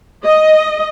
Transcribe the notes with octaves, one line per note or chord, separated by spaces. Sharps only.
D#5